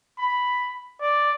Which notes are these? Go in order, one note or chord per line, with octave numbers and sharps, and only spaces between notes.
B5
D5